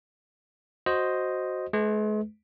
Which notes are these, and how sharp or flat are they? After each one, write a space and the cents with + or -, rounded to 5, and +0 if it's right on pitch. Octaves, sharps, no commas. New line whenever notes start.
F#4 +0 C5 +0 D#5 +0
G#3 +40 B4 +15